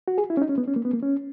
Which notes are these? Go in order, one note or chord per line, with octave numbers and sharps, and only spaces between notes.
F#4
G#4
E4
C#4
D#4
C#4
B3
C#4
A#3
B3
A#3
C#4